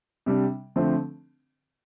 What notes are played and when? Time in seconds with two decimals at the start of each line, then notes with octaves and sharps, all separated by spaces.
0.26 C3 G3 D4
0.76 D3 F3 A3 C4